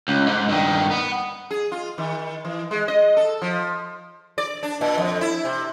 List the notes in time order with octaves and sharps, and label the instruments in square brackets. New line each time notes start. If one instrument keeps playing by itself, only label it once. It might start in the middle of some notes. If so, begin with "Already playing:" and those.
[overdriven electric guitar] C#2
G#2
G2 D#3
B3
[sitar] G#4
F4
D#3
E3
G#3
D#5
A4
F3
D5
D4
A#2
F2
E4
C3